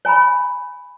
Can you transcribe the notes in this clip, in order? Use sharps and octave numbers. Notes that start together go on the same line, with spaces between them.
C#5 G#5 A#5 B5